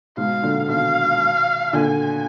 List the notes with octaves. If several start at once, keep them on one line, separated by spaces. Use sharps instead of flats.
G#2 B2 F5
A#2 D3
B2 D#3 F5
A#2 D3 G#5